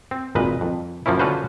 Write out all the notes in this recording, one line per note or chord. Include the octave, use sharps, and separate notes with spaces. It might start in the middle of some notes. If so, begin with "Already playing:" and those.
C4
G#1 A#2 B4 D#5
F2
F#2 F3 A#3 C#4 E4
D3 C#4 F4 F#4 B4 C5